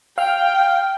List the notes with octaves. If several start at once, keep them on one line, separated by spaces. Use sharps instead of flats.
F5 G5 F6